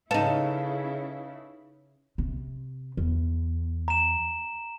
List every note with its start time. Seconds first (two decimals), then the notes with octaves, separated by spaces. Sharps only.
0.11 C#3 D#4 E4 A4 B4 F5
2.18 C3
2.97 E2
3.88 A#5 E7